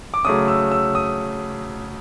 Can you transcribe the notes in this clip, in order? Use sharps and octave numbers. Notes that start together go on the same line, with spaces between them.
D6
C#3 F#3 A3 C#4 D#6
E6
E6
D#6